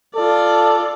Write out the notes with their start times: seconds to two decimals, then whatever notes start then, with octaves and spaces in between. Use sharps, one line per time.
0.15 F4 A4 D5